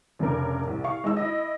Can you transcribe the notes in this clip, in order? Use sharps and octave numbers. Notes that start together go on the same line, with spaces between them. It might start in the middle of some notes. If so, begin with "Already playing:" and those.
F1 C#3 D4 A#4
C2
F5 C#6
G#3 D#4 E6
E4 D#5